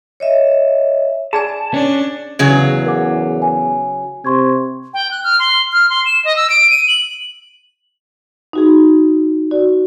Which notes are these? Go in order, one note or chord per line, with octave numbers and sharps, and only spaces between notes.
C#5 D#5 E5
G#4 D5 G#5 A5
C#4 D4
E2 C#3 F#3 G#4
A#4 F#5 D6
G#5
C3 C6 C#6 G#6
G5
F#6
F6
C6
F6
C6
E7
D#5
E6
D7
D#7
F#7
D#4 F#4 G#4
F#4 D5